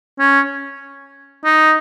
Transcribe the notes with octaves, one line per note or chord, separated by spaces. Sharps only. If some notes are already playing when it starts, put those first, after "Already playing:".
C#4
D#4